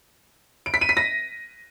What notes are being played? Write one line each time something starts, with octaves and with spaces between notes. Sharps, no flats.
D7
B6
D#7
B6
A#6